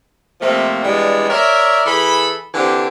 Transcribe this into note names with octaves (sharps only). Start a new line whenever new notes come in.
C3 F3 A3 A#3 C4
E3 G3 G#3 B3 D4
A#4 C#5 D5 E5
E3 G#4 A4 B5
D3 E3 C4 G4